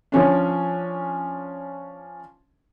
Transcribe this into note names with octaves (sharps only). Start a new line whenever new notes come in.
F3 C#4 D4